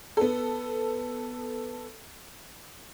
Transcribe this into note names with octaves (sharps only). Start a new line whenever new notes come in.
B3 A4